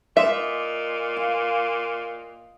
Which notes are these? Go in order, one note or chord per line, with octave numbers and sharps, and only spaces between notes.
A#2 D#5 E5 C6 D6
F5